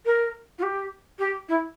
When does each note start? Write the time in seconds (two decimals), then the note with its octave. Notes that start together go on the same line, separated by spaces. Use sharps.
0.05 A#4
0.58 F4
0.62 G4
1.19 G4
1.48 E4